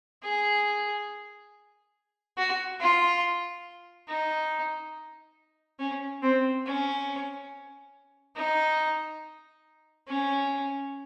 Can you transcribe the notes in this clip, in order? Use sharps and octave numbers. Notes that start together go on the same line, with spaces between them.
G#4
F#4
F4
D#4
C#4
C4
C#4
D#4
C#4